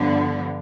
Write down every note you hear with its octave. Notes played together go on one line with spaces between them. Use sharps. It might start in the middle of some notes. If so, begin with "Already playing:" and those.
Already playing: G2 D3 F3 B3